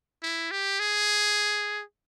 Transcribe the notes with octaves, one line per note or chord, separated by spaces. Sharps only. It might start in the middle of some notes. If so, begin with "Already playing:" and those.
E4
G4
G#4